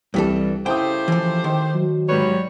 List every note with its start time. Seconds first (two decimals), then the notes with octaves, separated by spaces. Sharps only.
0.14 C2 G2 E3 G3 A4
0.66 C#3 A3 E4 G4 C5 G5 D#6
1.08 E3 F3
1.44 D#3
1.75 F#3
2.09 G#2 G3 B4 C#5